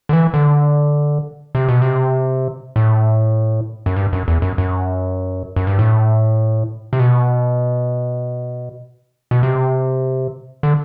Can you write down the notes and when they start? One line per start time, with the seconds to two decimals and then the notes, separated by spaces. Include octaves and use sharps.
0.09 D3
0.13 E3
0.34 D3
1.55 C3
1.69 B2
1.82 C3
2.76 A2
3.86 F#2
3.96 G2
4.13 F#2
4.28 E2
4.42 F#2
4.58 F#2
5.56 F#2
5.67 G2
5.79 A2
6.93 C3
6.99 B2
9.31 B2
9.43 C3
10.63 D3